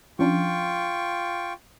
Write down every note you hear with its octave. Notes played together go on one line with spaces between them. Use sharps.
F3 C#4 D4 F4 G5 C#6